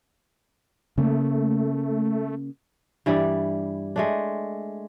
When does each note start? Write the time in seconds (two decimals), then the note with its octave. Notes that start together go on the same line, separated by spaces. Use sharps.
0.98 C#3 A3 A#3
3.06 G2 E3 G3 D5
3.96 G#3 A3 D4